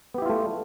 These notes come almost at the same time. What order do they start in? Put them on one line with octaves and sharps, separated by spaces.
B3 G4 E4 F4 A3